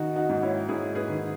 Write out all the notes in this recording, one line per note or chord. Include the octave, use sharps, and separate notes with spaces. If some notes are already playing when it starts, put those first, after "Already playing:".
Already playing: D#3 D#4 F#4
D#4 F#4
G#2
C#4 E4
G#2 E4 G#4
G#4 B4
D#3